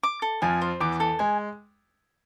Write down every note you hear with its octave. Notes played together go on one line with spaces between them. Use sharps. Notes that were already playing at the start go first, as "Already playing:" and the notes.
D6
A4
F2 F3 G#5
C5
E2 E3 D6
A4
G#3 G#5